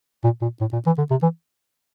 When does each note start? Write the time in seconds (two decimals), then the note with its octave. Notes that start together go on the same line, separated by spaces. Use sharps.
0.24 A#2
0.42 A#2
0.61 A2
0.73 A#2
0.86 E3
0.98 D3
1.11 C3
1.23 E3